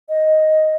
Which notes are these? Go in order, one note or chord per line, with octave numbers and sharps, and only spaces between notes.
D#5